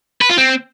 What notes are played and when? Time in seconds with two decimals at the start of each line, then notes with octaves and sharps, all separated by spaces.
0.21 B4
0.29 F4
0.38 C4